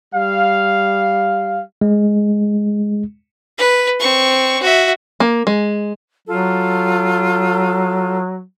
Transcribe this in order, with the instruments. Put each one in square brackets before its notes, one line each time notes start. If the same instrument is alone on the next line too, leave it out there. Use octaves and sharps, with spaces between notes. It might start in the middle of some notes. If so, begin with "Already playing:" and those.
[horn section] G3 F5
[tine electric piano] G#3
[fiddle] B4
C4 C#6
F#4 E5
[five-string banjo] A#3
G#3
[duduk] F#3 [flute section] F4 A4